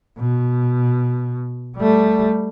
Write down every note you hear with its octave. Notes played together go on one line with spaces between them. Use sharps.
B2
G3 A3